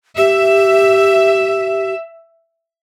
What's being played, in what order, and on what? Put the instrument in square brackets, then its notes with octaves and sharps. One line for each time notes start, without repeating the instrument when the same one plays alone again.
[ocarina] G4 [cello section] E5